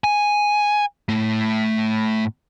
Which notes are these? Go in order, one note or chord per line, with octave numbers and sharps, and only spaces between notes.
G#5
A2 A3